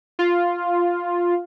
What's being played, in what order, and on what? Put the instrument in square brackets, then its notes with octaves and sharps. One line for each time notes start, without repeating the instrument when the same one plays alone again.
[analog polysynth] F4